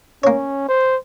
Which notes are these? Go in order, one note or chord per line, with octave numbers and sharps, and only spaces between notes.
A#3 C#4 C#5
C5